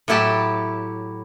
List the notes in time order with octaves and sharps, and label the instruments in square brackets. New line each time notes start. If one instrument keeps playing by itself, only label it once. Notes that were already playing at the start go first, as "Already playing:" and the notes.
[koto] A2 F#3 E4 G4 A5